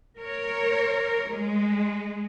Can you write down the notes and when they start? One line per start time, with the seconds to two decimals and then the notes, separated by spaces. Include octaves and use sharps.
0.18 A#4 C#5
1.29 G#3